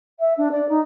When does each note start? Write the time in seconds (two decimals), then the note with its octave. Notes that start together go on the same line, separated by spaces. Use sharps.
0.19 E5
0.37 D4
0.51 D5
0.69 D#4